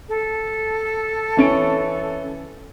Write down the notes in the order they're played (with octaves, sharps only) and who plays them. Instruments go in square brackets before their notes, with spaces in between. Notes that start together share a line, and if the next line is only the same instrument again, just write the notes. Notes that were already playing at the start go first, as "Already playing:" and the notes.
[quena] A4
[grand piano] E3 C#4 D7